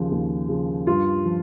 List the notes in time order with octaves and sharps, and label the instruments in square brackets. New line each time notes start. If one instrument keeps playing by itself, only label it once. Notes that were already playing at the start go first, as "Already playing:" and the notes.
Already playing: [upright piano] D#2 C#3 F3
D#2
C#3 F3
G2 F4
F3